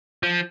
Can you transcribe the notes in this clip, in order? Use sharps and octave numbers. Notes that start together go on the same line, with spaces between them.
F3